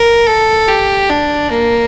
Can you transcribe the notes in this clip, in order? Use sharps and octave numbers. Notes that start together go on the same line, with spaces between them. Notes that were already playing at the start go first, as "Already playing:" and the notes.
Already playing: A#4
A4
G4
D4
A#3